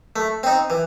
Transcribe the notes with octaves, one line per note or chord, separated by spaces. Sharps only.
A3
C4 D#4
E3